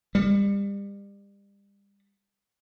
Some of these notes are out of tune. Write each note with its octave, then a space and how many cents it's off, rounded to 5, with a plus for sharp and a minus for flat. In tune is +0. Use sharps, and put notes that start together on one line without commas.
G3 +35